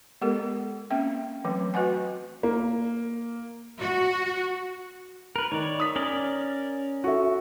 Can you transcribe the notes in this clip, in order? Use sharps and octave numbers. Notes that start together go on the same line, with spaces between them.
G#3 B3 G4 A4 A#4
A#3 C4 C#4 E5 G5
E3 F#3 A3 C4
F#4 B4 D#5 F#5 G#5
A#3
F#4
A#4 B4
D#3 C#5 D5
D#6 B6
C#4 A#4 D5
F#4 A4 E5